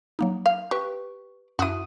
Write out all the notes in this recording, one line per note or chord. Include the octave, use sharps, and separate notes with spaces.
F#3 A#3 D#4
F5
G4 B4 C#6
F#2 E4 F#4 D#6 D#7